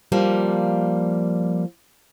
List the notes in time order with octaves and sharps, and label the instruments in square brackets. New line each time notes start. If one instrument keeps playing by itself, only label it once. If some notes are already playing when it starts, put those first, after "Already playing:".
[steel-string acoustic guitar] F3 G3 A#3